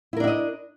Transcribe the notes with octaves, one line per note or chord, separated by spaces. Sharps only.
D4 E4 A#4 D#5 E5